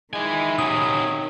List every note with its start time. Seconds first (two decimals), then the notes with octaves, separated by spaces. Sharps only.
0.13 D#3 G#3 E4 G#5
0.59 C3 F#3 C#4 D#6